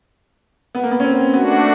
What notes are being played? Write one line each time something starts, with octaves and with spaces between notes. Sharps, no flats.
B3
A#3
B3
C#4
C4
A3 B3 D4 F#4